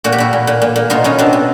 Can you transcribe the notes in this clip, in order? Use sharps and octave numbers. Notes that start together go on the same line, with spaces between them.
A#2 F#4
G4
A#2 E4 F#4
A#2
A#2
A#2
A#2
B2 D#4 F4
B2 C#4 D#4
B2 C4 D4
B2